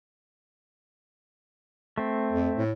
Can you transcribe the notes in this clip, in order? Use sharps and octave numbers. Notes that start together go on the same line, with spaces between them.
A3 C4
F2
A2